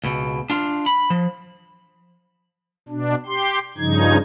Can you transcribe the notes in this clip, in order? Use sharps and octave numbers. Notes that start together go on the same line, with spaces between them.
C#2 B2
D4 F4
B5
F3
B2 D4
G4 C6
G2 C#3 F3 D#4 G#6